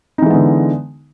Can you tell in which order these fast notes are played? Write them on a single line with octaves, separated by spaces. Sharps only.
D#4 E3 G#3 B3 D3